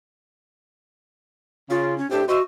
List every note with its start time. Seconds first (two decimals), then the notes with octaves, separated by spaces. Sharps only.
1.70 C#3 F4
1.98 C#4
2.11 A2 C4 D4 G4
2.28 F#4 C5 D#5 E5